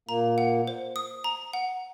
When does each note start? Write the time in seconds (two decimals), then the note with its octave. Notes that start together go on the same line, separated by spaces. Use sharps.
0.09 A#2 A#3 A#5
0.38 F#5
0.67 C5
0.96 D#6
1.24 A#5
1.53 F#5